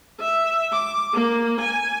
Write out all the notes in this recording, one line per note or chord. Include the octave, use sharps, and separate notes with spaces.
E5
D6
A#3
G#5